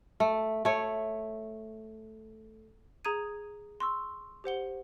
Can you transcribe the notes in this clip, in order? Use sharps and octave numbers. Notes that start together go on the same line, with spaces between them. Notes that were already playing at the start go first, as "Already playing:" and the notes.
A3
A3 C#5
G#4 A#5 D#6 G#6 D#7
C6 C#6 E6
G4 C5 F#5 G7